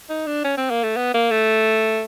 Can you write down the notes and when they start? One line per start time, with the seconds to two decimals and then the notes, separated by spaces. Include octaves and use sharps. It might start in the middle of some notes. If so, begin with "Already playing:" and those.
0.10 D#4
0.27 D4
0.44 C#4
0.57 C4
0.71 A#3
0.84 A3
0.97 B3
1.14 A#3
1.31 A3